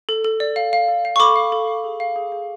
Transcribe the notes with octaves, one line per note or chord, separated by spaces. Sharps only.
A4
A4
D5
F5
F5
A4
F5
C#6
A4 B5 D6
F5
A4
F5
G#4
F5
G#4
G#4